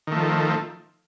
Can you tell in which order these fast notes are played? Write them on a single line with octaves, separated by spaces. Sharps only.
D#3 A3 F3